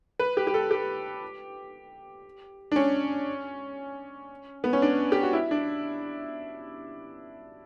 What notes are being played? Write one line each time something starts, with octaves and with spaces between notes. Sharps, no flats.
B4
G4
G4
A4
G4
D4
C#4
B3
C#4
D4
G4
F#4
E4
D4